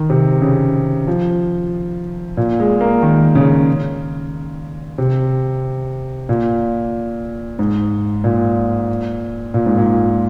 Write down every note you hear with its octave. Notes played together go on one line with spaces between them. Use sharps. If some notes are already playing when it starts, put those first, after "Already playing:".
Already playing: D#3
C3
C#3
F3
A#2
G#3
A#3
D#3
C#3
C3
A#2
G#2
A#2
A#2
G#2
A#2